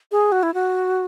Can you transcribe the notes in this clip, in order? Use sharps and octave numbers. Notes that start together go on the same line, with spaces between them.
G#4
F#4
E4
F#4